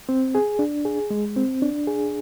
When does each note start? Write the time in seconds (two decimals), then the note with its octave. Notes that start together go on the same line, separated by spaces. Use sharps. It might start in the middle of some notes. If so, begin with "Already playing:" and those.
0.09 C4
0.35 G#4
0.59 D4
0.85 G#4
1.10 G#3
1.36 C4
1.62 D4
1.87 G#4